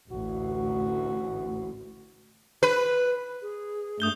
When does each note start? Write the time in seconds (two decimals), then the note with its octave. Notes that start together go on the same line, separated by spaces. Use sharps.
0.11 A1 D2 F#4
2.63 B4
3.42 G#4
4.00 G2 A3 D#6 G6 G7